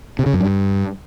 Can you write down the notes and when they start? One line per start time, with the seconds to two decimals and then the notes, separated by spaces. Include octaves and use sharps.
0.19 C3
0.26 C#3
0.33 F#2
0.41 G2